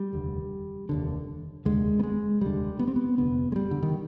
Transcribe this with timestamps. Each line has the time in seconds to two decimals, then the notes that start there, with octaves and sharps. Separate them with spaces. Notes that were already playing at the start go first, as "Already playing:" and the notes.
Already playing: G3
0.13 F1 D#2 D3
0.89 F1 D#2 D3
1.65 F1 D#2 D3 G#3
1.99 B3
2.03 G#3
2.41 F1 D#2 D3 G3
2.79 B3
2.88 C4
2.96 B3
3.18 F1 D#2 D3 B3
3.52 G#3
3.56 G3
3.71 D3
3.83 D#3